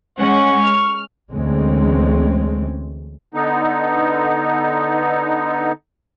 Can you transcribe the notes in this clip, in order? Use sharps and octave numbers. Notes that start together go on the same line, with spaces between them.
G#3 C#4 F#5 C#6
F6
D2 E3 G#3 C4 C#4
D3 B3 D#4